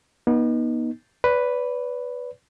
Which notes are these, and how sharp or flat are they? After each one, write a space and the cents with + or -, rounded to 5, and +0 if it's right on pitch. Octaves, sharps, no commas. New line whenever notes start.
B3 -40 D#4 +0
B4 +0 D5 -40